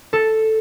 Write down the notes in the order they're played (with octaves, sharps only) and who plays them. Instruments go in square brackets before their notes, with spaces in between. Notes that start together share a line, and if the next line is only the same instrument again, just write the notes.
[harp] A4